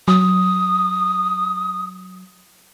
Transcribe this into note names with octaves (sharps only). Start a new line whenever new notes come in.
F#3 D#6